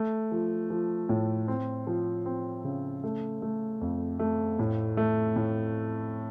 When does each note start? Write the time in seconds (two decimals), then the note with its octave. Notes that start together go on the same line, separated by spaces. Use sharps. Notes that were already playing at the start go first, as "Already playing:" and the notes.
Already playing: A3
0.32 F3
0.70 F3
1.09 A2
1.48 C4
1.87 F3
2.26 C4
2.64 C#3
3.04 A3
3.42 A3
3.81 F2
4.19 A3
4.59 A2
4.97 A3
5.36 A2